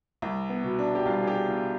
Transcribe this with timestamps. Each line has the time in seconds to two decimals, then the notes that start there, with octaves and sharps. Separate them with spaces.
0.22 C2
0.49 B3
0.64 B2
0.79 D4
0.95 G4
1.06 C2 F4
1.23 G#4
1.27 G4
1.48 B2 F4